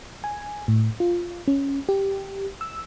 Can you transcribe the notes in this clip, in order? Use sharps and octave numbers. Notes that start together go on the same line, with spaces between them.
G#5
A2
F4
C#4
G4
E6